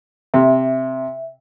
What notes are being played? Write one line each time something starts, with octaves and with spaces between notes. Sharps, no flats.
C3 E5